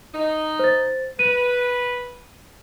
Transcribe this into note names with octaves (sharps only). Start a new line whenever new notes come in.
D#4
C5 A6
B4 D#7